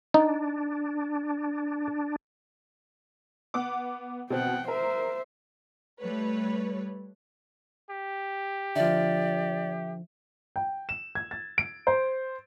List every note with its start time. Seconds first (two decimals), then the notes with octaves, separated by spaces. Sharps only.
0.14 D4 D#4
3.54 B3 F#5 D6
4.30 B2 C4 F#5 G5
4.68 A#4 C5 E5
6.01 G3 A3 B4 C#5
7.90 G4
8.76 D3 F3 D5 E5
10.56 G5
10.89 E7
11.15 G#6
11.31 A6
11.58 D7
11.87 C5